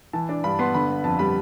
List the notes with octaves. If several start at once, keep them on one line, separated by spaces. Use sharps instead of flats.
E3 A5
D4
G2 B5
B3 C6
D3 B5
B3
F2 A5
G3 B5